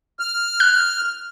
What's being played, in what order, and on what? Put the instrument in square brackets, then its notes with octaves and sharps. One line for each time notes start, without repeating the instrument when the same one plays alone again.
[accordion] F6
[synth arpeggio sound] F#6